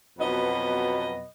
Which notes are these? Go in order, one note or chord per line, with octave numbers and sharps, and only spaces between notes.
F2 B2 F#3 B3 B4 D#5